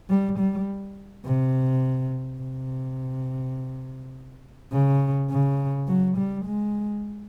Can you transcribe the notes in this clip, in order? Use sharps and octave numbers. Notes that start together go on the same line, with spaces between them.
G3
G3
C3
C3
C#3
C#3
F#3
G3
G#3